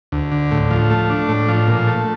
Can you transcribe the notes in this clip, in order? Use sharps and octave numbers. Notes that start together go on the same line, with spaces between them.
D2
D3
A2
F3
A3
D4
A2
F3
A#2
A3